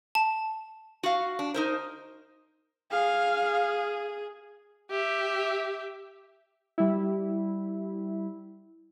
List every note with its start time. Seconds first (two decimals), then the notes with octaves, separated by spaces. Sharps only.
0.15 A5
1.03 F#4 F5
1.39 D4
1.54 D#4 A#4 C5
2.91 G#4 F5
4.90 G4 E5
6.78 G3 E4